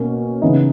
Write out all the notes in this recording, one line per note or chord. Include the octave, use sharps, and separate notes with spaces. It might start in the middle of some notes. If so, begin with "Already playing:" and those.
Already playing: B2 A#3 C#4
C#3 E3 B3 D#4